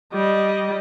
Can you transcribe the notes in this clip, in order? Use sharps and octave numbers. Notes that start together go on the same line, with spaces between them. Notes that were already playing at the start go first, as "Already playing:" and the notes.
G3 D#5